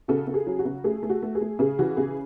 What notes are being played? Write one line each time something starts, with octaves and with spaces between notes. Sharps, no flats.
C#3 F#4 A4
C#3
G#4
F#3
F#4
C#3
A3 G#4
A3
F#4
A3
G#4
A3
C#3 G#4
E3 F#4
C#3 G#4